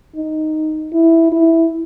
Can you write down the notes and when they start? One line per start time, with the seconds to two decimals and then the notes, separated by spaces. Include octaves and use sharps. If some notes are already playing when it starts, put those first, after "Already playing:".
0.16 D#4
0.93 E4
1.32 E4